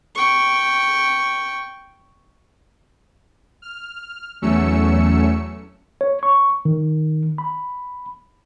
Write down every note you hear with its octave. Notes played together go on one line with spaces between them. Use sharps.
G5 C#6
F6
E2 F#3 A3 C#4 E6 C#7
C#5
C#6
D#3
B5